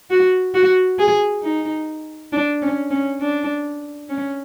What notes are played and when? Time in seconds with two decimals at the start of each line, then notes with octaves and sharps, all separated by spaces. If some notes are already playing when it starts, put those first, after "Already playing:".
0.10 F#4
0.54 F#4
0.99 G#4
1.43 D#4
2.32 D4
2.62 C#4
2.91 C#4
3.21 D4
4.09 C#4